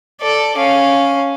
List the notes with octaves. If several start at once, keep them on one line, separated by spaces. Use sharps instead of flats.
A4 D5
C#4 F5